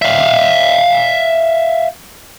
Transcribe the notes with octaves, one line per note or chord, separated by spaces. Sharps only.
E5 F5